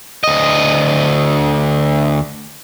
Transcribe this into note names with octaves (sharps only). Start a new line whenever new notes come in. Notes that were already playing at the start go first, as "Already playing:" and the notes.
D2 D#5